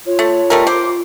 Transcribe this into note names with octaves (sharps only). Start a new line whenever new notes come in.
F4 C#5
A3
G3 A3 A#4
C5 D6